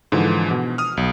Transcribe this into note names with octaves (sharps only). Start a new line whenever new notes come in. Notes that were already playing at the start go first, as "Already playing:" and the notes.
G#2 D3 E3 F3
B2
D#6 F6
B1